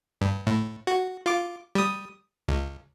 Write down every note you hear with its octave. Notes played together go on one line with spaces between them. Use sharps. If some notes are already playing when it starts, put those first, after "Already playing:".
G2
A2
F#4
F4 D6
G3 D#6
C#2